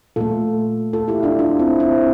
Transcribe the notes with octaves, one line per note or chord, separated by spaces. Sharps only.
A#2 A3 F4 A4
F4 A4
E4 G4
D4 F4
D4 F4
C4 E4
C4 E4